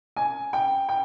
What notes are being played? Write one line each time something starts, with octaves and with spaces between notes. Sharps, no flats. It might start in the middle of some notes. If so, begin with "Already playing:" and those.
G#5
G5
G5